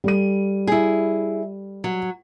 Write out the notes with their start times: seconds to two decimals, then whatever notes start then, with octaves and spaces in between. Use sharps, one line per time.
0.04 G3 A4 D#7
0.67 E4 G#4
1.84 F#3